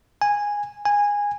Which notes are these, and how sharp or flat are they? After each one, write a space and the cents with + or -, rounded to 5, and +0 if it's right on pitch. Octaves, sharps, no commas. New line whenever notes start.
G#5 -10
G#5 -15